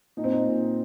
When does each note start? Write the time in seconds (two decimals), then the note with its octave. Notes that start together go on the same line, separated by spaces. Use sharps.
0.17 A#2 D#4
0.24 C4
0.32 D#4
0.46 A#2